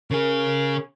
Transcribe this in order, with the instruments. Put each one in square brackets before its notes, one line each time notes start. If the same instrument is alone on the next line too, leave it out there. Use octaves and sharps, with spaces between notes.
[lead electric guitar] C#3 G#4 [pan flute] A#4